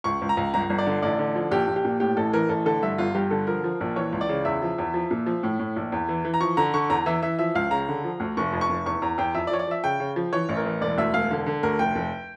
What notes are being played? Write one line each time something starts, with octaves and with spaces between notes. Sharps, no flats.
C#2 C#6
C#2
A#5
C#2
G1 A#5
G1
D5
D3
A1 D5
D3
F3
A#1 G4
A#1
G4
A#2
A2 G4
A1 A4
E3 A#4
A1 A4
D3 A4
G2 E5
G1 F4
G2 G4
D3 A4
F3 A#4
F3
A#1
E3 C#5
C#2
D5
C#3
E2 E5
F3
E2
F3
A#2
F3
A2
A2
A#1
E2
E3
E3
A#5
F3 C#6
D3 A#5
D3 C#6
E2 A#5
E3 E5
E3 E5
F3 E5
C#2 F5
C#3 A#5
D3
F3
D2
F1 C#6
F2
C#6
F1
E2 C#6
E2 A#5
E2 G5
F2 E5
D5
F3 C#5
D5
F3 E5
C#3 G5
C#3
F3
E3 C#5
A1
A#4
E3
E1 D5
D2 E5
E1 F5
D3
D3
D2 A#4
F1 G5
F1